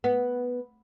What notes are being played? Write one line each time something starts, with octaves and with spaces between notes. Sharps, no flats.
B3